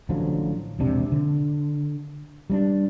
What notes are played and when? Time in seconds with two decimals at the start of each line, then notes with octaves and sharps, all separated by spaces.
0.09 A1 D3 F3 F#3
0.79 E1 A#1 C3 D4
1.12 D3
2.50 G3 C4 D4